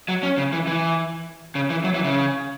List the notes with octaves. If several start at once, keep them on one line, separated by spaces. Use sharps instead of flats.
F#3
C#4
C#3
E3
E3
C#3
E3
F#3
E3
C#3